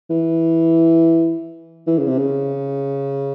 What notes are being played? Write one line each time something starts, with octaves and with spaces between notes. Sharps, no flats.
E3
E3
C#3
C3
C#3